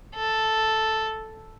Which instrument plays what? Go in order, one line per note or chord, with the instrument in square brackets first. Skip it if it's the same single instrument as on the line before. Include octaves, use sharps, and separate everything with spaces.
[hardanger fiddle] A4